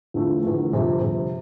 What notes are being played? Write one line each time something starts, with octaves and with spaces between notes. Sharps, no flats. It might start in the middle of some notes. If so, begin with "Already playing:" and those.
E2 D3 F3 A3
E2 D3 F3 A3
G1 F2 C3
G1 F2 C3